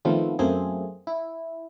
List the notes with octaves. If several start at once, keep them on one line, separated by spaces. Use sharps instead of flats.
D#3 F3 A3 B3 C4 F4
F#2 A3 A#3 C4 G#4
E4